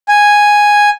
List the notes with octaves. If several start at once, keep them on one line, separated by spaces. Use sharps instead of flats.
G#5